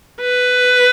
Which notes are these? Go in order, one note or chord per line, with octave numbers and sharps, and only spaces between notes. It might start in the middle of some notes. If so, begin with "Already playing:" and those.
B4